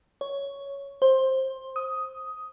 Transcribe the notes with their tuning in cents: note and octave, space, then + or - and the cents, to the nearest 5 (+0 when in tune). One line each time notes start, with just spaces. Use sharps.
C#5 +5
C5 +15
D#6 +10